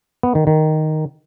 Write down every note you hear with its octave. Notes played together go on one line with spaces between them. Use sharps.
B3
D#3
D#3